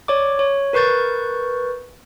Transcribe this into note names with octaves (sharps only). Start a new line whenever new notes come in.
C#5 D5 D6
C#5
A#4 B4 C#6 G6 A6